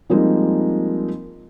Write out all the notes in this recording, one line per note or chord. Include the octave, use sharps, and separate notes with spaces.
F3 G3 G#3 A#3 C4 D#4